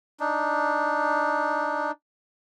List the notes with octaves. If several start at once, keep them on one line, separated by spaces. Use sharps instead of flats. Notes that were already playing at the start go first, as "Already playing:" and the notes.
D4 D#4